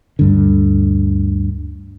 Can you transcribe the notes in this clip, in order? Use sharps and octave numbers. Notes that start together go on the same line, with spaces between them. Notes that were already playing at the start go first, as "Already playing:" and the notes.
D2 G2 D3